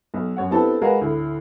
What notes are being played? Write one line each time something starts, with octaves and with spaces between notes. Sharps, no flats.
B1
F#2 C#5 F#5
B3 C4 D4 E4 G4 A4
G#3 F#4 G#4 A#4 B4 F5
D2 A2